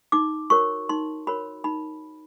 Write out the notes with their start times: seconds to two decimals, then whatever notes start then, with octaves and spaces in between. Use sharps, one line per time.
0.12 D#4 D6
0.50 F#4 A#4 C#5 C#6
0.89 D#4 C6
1.27 F#4 A#4 C#5 B5
1.64 D#4 B5